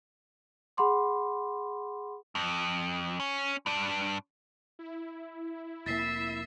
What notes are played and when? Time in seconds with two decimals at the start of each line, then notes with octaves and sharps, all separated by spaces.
0.77 G#4 F#5 B5 C6 D6
2.35 F2
3.20 C#4
3.66 G2 D4
4.79 E4
5.86 F1 F2 A#3 E5 A6 B6 C7